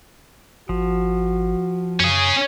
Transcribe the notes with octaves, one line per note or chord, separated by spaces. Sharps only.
G#1 F3 F#4
F#2 C#4 G#4